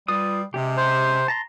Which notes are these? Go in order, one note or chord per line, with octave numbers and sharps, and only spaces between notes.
G3 F4 B4 D#6
C3 G#3 C#4 G4
C5
A5 A#5 C6